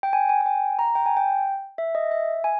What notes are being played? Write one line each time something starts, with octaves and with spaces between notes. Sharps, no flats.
G5
G#5
G#5
G#5
G5
A#5
G5
G#5
G5
E5
D#5
E5
G#5